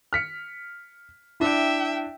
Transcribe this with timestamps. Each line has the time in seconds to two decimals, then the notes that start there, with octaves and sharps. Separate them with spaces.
0.13 F6 B6 C#7
1.40 D4 E4 E5 G5